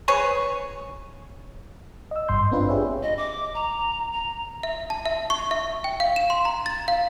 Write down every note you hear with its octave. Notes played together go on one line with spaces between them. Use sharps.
G#4 B4 C#5
D#5 E6
G#1 G2 C6 G6
B3 C4 D4 F4 B4
G4 G#4 C#5 E5
D#5
D6
A#5
A#5
E5
A5
E5
C#6
E5
G5
F5
E7
C6
A#5
A6
F5